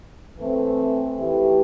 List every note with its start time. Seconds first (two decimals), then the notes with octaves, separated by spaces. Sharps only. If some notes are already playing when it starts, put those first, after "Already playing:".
0.37 E3 A3 C4
1.19 E3 A3 E4 G4